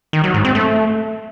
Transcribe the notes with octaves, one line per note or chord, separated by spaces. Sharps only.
D#3
F#3
G#2
C4
A3